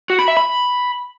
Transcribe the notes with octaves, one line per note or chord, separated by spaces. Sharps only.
F#4
B5
E5
B5